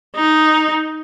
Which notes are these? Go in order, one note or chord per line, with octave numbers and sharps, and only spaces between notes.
D#4